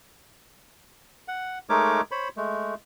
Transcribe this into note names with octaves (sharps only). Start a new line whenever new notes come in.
F#5
G#3 A3 D#4 A#4 C#5 D6
C5 C#5 B5
G#3 A3